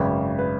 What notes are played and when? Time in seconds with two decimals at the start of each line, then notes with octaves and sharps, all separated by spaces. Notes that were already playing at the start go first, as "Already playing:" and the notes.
Already playing: G#1 F#2 C#3 B4
0.39 B4